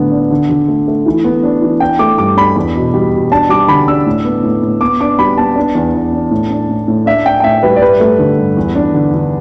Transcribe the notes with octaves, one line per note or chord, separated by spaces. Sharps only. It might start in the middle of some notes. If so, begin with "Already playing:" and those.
Already playing: A2 D3 B3 D4
D4
D3
D3
A3
A3
E3
B3
D4
E3
D4 G5
A3 D6
G2 D6
D4 B5
E2
B2
G3
B2
D4 A5
G3 D6
D3 B5
D4 E6
A2
B3
A2
A2
B3 D6
D4 D6
G3 B5
B3 A5
D4
E2
E2
D4
A2
D4
A2
A2
D4 E5
D4 G5
G5
A2 E5
G3 B4
D5
G2 B4
A3
D3
G2
E2
D4
D3
D3